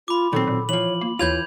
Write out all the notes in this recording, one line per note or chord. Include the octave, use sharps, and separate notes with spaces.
F4 B5 D6
A#2 D#3 F#3 C4 A4
A#2
E3 F3 C#5 F#7
A#3 F4
D#2 E3 F4 C#5 G6 G#6 F7